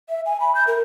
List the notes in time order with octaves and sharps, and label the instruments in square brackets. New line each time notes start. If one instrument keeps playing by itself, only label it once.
[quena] E5
G#5
B5
G6
A#4